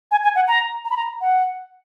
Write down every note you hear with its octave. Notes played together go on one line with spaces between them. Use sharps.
G#5
G#5
F#5
A#5
A#5
B5
A#5
F#5